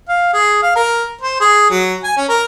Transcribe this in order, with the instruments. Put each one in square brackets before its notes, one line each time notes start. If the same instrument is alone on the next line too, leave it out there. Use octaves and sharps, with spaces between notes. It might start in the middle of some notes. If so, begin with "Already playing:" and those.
[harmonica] F5
G#4
F5
A#4
C5
G#4
F#3
G#5
C#4
A#4